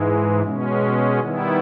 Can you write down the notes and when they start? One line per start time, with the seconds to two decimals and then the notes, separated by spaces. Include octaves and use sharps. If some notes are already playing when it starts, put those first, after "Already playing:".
Already playing: G#2 E3 G#3
0.42 B2 G#3 C#4
1.20 D#3 G3 B3 E4